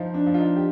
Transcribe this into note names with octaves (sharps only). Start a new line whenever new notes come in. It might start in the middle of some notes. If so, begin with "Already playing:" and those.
Already playing: F3 D#4
D4
F3
F4
D#4
G4